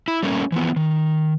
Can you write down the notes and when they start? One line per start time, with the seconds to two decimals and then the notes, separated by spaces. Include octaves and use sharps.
0.08 E4
0.23 G3 A3 A#3 C#4
0.52 E3 F3 B3
0.76 D#3